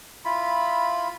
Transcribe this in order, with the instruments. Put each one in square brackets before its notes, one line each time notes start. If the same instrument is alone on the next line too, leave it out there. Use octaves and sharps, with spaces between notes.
[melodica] E4 F4 B5